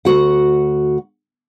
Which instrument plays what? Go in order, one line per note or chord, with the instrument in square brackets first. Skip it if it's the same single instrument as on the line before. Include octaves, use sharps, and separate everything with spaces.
[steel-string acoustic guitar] D2 E3 F#4 F#5